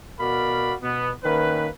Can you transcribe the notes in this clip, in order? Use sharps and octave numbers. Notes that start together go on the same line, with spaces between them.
B2 F#4 A#4 D5 F5 B5
B2 B3
D#3 A#3 C#4 B4